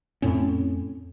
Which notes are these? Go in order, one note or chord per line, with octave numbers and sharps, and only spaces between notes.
F2 A2 C4 C#4